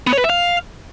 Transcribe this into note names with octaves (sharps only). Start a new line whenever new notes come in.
B3
C#5
B4
E5
F5